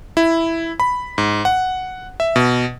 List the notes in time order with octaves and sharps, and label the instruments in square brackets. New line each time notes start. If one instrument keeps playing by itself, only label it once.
[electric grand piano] E4
B5
G#2
F#5
E5
B2